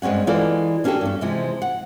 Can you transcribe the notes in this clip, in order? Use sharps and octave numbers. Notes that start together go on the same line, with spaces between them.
G2 G#3 C4 C#4 F#5
E3 G#3 F4 A4 D5
A#3 C#4 D4 F#4 G4 A4
G2 C#4
C3 E3 F3 G#3
F#5